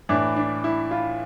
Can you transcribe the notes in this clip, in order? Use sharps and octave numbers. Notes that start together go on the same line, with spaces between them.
A2 E3 D4
D4
E4
F4